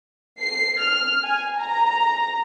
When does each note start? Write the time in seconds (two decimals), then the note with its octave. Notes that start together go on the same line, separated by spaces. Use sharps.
0.40 C7
0.80 F6
1.24 G#5
1.59 A#5